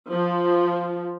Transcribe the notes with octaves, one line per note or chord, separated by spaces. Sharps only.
F3